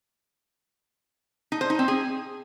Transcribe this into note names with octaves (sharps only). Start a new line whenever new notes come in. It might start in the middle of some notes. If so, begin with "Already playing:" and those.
D#4
C5
D#4
C4
G#4